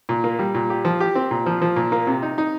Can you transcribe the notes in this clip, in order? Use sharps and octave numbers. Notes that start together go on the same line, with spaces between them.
A#2
A#3
G3
A#2
G4
F3
G4
C4
A#2
F3
F3
A#2
A#3
C3
D#4
D#4